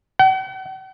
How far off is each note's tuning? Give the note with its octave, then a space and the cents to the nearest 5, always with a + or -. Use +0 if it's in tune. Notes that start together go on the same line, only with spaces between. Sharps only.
F#5 +45